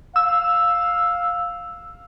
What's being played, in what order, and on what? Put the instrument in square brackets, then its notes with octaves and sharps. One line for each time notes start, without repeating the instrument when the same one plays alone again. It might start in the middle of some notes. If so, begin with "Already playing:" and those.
[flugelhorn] F5 [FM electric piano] E6